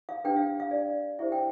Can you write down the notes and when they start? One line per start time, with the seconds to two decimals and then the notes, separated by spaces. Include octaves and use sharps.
0.09 F5
0.24 D4 G4 B4 G5
0.36 F5
0.60 F5
0.71 D5
1.19 E4 G4 C5 E5
1.32 G5